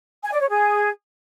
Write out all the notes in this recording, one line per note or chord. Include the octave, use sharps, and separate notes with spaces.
G#5
D5
C#5
G#4